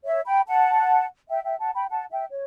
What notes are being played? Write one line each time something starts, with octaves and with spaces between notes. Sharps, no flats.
C#5 E5
G5 B5
F#5 A5
E5 G5
E5 G5
F#5 A5
G5 B5
F#5 A5
E5 G5
C#5